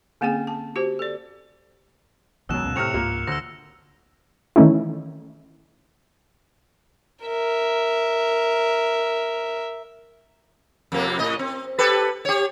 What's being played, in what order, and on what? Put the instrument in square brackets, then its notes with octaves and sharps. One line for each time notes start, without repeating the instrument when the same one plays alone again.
[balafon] D3 A#3 C4 C#4 G#4 G#5
A5
F#4 G4 C5
A4 D5
[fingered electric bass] A#1 D#3 G#3 [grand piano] F#2 B2 [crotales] E6 F#6 E7
[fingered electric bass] C#2 A#2 C#4 [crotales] E6
[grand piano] A2 C3 F6 [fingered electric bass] C4 [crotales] C#7 E7 F7
[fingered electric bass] C#2 G#2 [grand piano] A#3 F4
[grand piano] D2 [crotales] E6 A#6
[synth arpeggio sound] D#3 E3 A3 C#4 D#4 E4
[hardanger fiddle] A#4 E5
[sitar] F2 C3 A#3
A2 D#5
C4
G4 A4 B4
G4 C#5